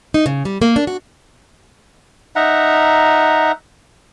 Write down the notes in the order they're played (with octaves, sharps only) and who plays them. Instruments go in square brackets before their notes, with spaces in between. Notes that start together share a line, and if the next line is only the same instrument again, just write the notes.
[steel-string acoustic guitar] D#4
C#3
G3
A#3
D4
F#4
[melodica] D#4 E5 F#5 A#5